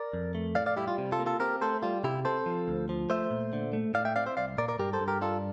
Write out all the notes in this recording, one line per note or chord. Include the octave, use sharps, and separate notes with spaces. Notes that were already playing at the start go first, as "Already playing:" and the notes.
Already playing: A#4 D5
F2
A3
A2 D5 F5
D5 F5
G3 E4 G4
F4
C3
F4 A4
A#3
F4 A4
C4 G4 A#4
A3 A4 C5
G3 F4
C3 E4 G4
C4 A4 C5
F3
D2
F3
A3 C5 E5
A#2
D3
A3
A2 D5 F5
E5 G5
C4 D5 F5
C5 E5
C2 D5 F5
A#2 A#4 D5
A#4 D5
G2 G4 A#4
A4 C5
G2
G4 A#4
D4 F4 A4